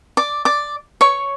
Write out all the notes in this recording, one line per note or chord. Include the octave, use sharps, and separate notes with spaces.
D5 D6
D5 D6
C#5 C#6